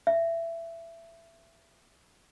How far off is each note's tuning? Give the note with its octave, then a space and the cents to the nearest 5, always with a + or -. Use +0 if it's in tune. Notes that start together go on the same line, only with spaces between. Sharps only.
E5 +20